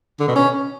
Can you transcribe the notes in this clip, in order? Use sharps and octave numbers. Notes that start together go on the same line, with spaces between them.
D3
B2
C#4